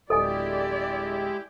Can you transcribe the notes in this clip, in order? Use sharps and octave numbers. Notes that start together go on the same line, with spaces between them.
D1 G#3 E4 G4 A4 D5 D#5 G#5